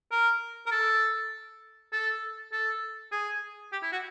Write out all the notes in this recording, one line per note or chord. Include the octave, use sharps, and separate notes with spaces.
A#4
A#4
A4
A4
A4
G#4
G4
E4
F#4